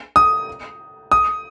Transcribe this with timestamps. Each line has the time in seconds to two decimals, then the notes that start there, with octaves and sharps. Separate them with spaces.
0.16 D#6
1.12 D#6